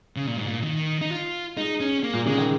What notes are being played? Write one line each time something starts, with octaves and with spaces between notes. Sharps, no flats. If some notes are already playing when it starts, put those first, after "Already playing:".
C#3
A#2
G#2
A#2
D#3
D#4
F4
G#3 D#4
C#4
A#3
A#2
C#3 G#3
D#3